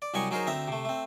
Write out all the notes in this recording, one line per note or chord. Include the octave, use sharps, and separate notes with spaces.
D5
C2 F#3 G3 D#5 G#5 C#6
F#3 D#4 G#4 A#4 C5 D#5
D2 C4 E5 A#5
C3 A3
A3 C4